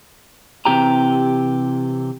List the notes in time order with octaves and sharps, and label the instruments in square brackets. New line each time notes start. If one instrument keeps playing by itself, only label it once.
[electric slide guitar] C3 E3 G4 A#5